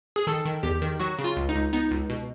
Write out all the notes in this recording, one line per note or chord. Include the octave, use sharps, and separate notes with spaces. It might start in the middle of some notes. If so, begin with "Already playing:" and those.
G#4
D#3 A4
D#3
E2 G4
D#3
F#3 F#4
C#3
F4
C#2
D#4
C#2
B3 D#4
C#2
B2